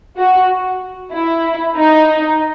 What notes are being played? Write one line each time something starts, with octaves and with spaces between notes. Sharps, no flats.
F#4
E4
D#4